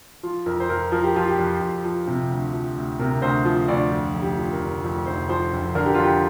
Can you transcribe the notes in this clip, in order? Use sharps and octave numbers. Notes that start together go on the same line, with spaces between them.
F3 F4
F2 A#4
C5
F2 A#4
F3 A#4
G4
F3 F4
G4
F2
F2
F3
C3
D2
F3
D2
C3 A#4
D2 C5
F3
D2 D5
F2
F1
G4
F3
A#4
F1
F2
F1 C5
F3 C5
F1
D3 A#4
G4
F2 F4
G4